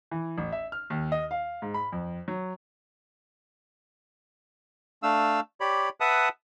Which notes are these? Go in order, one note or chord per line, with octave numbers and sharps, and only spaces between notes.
E3
A1
E5
F6
D#2
D#5
F5
G#2
B5
F2
F#3
A3 D4 F5 E6
G4 C#5 D5 B5
B4 E5 F#5 A5 D#6